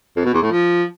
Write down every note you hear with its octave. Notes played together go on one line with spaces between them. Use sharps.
F2
B2
E2
A2
F3